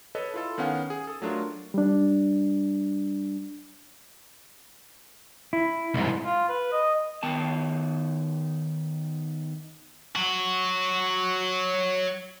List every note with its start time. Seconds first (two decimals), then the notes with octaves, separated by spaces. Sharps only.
0.15 A4 B4 C#5 D#5
0.34 E4 F4 A4
0.58 D#3 B3 C#4 F5 F#5
0.90 G#4
1.07 A4 D#6
1.22 F#3 A3 D4 F4 A#4
1.74 G3 D4
5.53 E4
5.94 C2 G#2
6.25 F4
6.49 B4
6.72 D#5
7.23 D#3 B3 A5
10.16 F#3 F#4